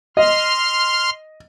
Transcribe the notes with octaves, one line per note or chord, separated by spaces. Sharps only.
D#5 C6 F6